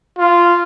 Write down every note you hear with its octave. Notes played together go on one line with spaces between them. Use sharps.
F4